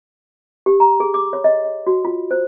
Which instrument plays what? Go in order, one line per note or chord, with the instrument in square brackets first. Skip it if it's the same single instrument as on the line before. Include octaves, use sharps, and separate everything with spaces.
[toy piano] G4
A#5
G#4
D6
C#5
D#5
D#5
F#4
F4
C5